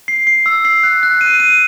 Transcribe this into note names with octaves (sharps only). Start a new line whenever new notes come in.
C7
C7
E6
C7
F#6
F#6
D#7
D#7